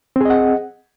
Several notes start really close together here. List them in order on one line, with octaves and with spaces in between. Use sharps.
C4 G#4 D#5 F#5